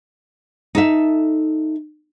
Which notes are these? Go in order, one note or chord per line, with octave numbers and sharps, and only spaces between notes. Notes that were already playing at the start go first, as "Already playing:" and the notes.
D#4 A4 E5